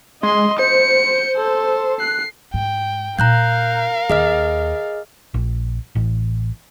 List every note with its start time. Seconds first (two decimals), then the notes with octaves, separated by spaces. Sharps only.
0.23 G#3 D#5 C6
0.59 C5 C#7
1.37 A4
2.00 F#6 C7
2.54 G#2 G5
3.19 A#2 D#4 A#4 F5 A#5 F#6 G6
4.10 D#2 G#4 D#5 F6
5.34 A#1
5.95 A1